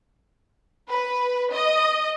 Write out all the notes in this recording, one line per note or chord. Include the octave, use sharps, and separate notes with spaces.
B4
D#5